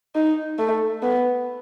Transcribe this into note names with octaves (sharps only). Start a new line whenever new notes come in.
D#4
A3
B3